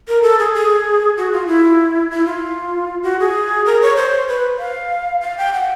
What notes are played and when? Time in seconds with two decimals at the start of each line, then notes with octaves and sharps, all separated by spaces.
0.08 A#4
0.23 A4
0.39 G#4
0.54 G#4
1.17 F#4
1.32 F4
1.47 E4
2.11 E4
2.26 F4
3.03 F#4
3.20 G#4
3.66 A#4
3.82 C#5
3.96 C5
4.28 B4
4.59 F5
5.21 F5
5.38 G5
5.53 F#5